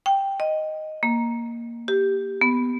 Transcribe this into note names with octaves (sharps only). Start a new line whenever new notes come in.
G5
D#5
A#3
G4
B3